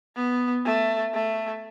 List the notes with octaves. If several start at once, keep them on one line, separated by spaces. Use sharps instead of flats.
B3
A3
A3